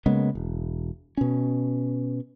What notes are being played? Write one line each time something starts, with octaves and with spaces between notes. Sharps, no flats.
C#3 G#3 A#3 B3
E1
B2 C#4